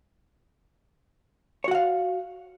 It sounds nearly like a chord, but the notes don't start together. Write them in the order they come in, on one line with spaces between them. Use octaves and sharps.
C#5 F#4 F#5 F5